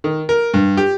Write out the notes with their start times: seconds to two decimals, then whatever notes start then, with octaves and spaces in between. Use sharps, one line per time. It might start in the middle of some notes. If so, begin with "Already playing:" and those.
0.04 D#3
0.29 A#4
0.54 G2
0.77 G4